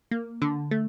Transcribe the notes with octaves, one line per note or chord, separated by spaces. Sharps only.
A#3
D3
A3